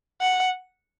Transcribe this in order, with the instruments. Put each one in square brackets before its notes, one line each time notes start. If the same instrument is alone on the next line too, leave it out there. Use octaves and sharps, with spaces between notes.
[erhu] F#5